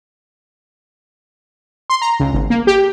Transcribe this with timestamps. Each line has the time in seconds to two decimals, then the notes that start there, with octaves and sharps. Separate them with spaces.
1.90 C6
2.02 A#5
2.20 C#2
2.34 G#1
2.50 A#3
2.67 G4